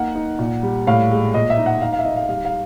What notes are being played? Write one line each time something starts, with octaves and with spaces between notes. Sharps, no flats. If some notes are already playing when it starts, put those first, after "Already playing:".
Already playing: A#3 D#4 F#5
D#4
A#2
G3
A2 F5
G#3
A#2 D#5
E5
D#4
F#5
D#4 F5
F5
E5
D#4 D#5
F5
G3 F5
F5